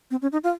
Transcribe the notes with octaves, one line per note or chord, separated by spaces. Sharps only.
C4
C#4
D#4
F4